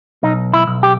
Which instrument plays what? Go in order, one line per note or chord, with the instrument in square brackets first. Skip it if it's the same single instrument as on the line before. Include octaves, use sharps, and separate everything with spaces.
[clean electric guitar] B1 D#4
E4
B1
G4